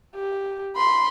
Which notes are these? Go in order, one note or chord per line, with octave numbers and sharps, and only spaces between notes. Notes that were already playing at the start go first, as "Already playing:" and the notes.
G4
B5 C6